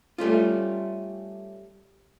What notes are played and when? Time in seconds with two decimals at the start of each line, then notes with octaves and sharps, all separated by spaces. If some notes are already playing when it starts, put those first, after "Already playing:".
0.18 G3 A3 C#4 F4